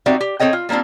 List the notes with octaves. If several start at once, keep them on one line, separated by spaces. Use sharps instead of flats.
C4 D#4 F#4 G4 D5 E5
G4
C4 A4 C#5 D#5 G5
F4
G3 A#3 C4 D4 F4